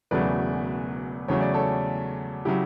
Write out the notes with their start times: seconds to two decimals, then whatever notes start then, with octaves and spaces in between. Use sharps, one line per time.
0.11 E1 E2 C#3 F#3 A3 B4 D5
1.28 E2 C#3 F#3 A3 C#5
1.41 D5
1.54 A4 C#5
2.45 C#3 F#3 E4 G4